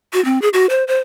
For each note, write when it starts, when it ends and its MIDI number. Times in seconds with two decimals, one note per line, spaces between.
0.13 0.23 66
0.25 0.41 60
0.42 0.49 68
0.53 0.66 66
0.70 0.84 72
0.88 0.99 72